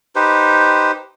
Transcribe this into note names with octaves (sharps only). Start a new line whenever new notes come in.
D#4 G4 B4 C5